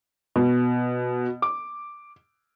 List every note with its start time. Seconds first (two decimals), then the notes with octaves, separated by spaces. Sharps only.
0.36 B2
1.42 D6